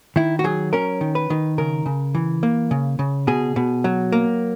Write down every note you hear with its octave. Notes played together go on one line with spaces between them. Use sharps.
D#3 E4
F#4
F#3 G#4
C#4 A#4
D#3
B4
D#3
C#3 A#4
C#3
E3
A#3
C#3
C#3
B2 G#4
B2
F#3
A#3